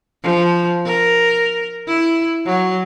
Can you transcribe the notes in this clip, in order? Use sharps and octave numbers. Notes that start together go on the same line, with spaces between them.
F3
A#4
E4
F#3